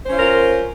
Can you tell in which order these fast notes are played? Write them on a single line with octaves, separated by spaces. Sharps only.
C5 C#4 F4 A#4